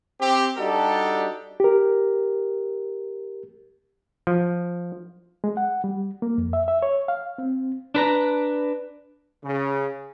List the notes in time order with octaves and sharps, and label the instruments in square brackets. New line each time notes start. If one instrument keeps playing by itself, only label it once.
[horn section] C4 G4
G3 D4 D#4 F#4 G4 A4
[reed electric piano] G4 A#4
[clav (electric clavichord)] F3
[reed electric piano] G#3
F#5
G3
A#3
F2
E5
E5
C#5
F5
C4
[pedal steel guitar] D4 B4 A#5
[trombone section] C#3